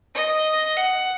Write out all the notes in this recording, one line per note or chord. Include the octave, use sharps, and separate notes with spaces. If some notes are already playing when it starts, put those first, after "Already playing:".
D#5
F#5